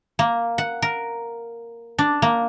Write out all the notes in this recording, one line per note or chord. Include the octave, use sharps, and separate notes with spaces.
A#3
F#5
A#4
D4
A#3